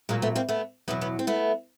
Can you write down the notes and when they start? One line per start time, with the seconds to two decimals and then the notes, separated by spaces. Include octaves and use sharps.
0.09 A#2 F#3 G#3 A#3
0.22 A3 B3
0.35 A#3 C4
0.49 A3 B3
0.88 E2 B2 F#3 B3 C#4
1.01 B3 C#4
1.19 C4
1.27 A3 B3